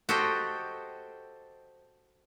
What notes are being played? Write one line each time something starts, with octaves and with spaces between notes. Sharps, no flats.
F#4 G4 A4 C5 D#5 G5